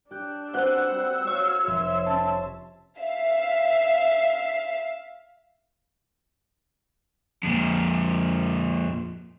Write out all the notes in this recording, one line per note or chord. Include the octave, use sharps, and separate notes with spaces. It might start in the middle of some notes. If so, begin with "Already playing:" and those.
D4 G4 F#6 G6
C4 F#4 B4 C5 F#5 E6 F#6
G3
F#4 C#5 F5
F1 E5 C6
C#4 A5
E5 F5
F2 A#2